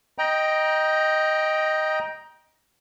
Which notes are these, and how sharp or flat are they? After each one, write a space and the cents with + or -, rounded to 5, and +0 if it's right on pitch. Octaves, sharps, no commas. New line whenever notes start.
D#5 +0 G5 +0 A#5 +25